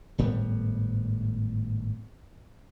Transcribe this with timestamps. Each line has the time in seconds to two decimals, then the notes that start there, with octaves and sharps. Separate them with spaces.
0.18 G#1 A2 G3 B3